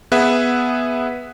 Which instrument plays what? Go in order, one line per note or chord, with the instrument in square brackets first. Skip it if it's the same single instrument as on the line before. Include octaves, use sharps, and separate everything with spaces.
[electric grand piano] B3 G#4 B4 E5 F#5